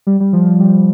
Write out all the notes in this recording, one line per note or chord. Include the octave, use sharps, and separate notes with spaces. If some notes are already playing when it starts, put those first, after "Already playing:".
G3
G3
F3
F3
G3